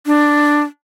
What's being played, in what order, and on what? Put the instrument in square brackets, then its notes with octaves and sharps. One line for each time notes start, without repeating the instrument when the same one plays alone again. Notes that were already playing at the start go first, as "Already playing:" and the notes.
[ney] D4